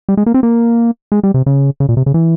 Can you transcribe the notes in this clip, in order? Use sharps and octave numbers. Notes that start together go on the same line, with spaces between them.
G3
G#3
A#3
C4
A#3
G#3
G3
C3
C#3
C#3
A#2
C3
C#3
E3